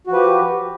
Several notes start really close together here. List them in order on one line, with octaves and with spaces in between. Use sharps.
F#4 F3 B4 G4